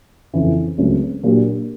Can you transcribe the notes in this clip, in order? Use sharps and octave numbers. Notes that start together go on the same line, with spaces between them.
F2 C#3 E3
C#2 C#3 F#3 A3 C4
A#2 F#3 A#3 D4 G4